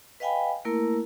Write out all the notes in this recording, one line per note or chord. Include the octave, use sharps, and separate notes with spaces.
B4 D#5 F5 G5 G#5 B5
A3 A#3 E4 A#4